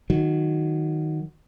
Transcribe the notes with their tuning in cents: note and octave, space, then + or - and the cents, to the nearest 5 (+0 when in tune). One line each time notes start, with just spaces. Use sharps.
D#3 +0 F#3 +0